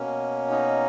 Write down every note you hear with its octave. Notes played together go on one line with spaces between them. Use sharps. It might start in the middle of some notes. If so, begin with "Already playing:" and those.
Already playing: B2 A#3 C#4
D#4